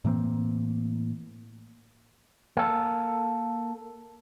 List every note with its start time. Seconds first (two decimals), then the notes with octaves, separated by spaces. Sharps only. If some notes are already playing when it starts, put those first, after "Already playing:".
0.05 A2 E3 A#3 C4
2.57 A#3 A4